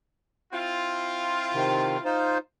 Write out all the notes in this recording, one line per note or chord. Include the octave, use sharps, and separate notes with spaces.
C4 E4 F4
C3 D#3
D#4 F4 C5